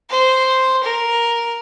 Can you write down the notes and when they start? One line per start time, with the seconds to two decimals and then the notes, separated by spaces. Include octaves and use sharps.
0.10 C5
0.83 A#4